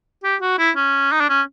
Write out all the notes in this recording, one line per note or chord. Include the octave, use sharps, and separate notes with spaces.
G4
F#4
E4
C#4
D#4
D4
C#4